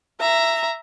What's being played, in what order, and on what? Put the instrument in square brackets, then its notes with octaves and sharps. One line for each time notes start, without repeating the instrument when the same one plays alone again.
[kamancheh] E5 A#5